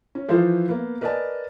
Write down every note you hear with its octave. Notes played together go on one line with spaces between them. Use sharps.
C#4
E3 F3 F4 A4 C5
A#3 B3
A#4 B4 D5 D#5 G#5 A5